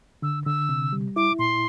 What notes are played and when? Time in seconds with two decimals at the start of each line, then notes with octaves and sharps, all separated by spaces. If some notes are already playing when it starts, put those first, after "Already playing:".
0.22 D3 E6
0.45 D3 E6
0.69 C3
0.93 G3
1.16 E4 D6
1.39 A#2 C6